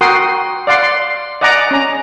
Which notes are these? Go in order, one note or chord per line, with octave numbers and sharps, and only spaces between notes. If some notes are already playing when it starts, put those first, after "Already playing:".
F#4 A#4 F#5 G5 C6 D#6
D5 F5 F#5 C6
C6
D5 D#5 F#5 G#5 A#5 D6
C#4 A#5